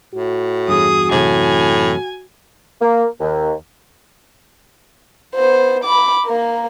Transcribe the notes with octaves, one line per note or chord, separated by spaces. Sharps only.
A2 F#4
E2 G2 G#4 D#6
F#2 A2 C3 E3 G#5
A#3
D#2
B3 C5
B5 D6
A#3 A#4